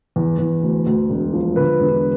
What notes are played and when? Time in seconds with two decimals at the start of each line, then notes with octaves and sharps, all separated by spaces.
0.16 E2
0.39 E2
0.63 D2
0.86 D2
1.10 E1
1.33 F3
1.56 D3 B4
1.80 E1